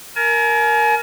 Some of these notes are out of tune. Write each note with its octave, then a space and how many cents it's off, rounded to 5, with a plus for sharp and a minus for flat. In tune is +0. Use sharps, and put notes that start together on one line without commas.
A#4 +0 G#5 +40